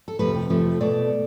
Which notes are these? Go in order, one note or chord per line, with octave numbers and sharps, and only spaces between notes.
A4
F2 C3 F3 A3 B4
G4
F2 C3 F3 A3
B2 A3 D5